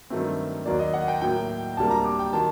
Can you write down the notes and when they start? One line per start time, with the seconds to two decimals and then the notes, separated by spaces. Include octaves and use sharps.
0.10 G2 D#3 F#3 A3 C4
0.66 D#2 D#3 F#3 A#3 D5
0.79 D#5
0.94 F#5
1.08 G5
1.21 A2 F#3 A#3 G5
1.77 D2 C3 G3 A#3 A5
1.91 A#5
2.04 D6
2.19 G5
2.32 D#3 F#3 A5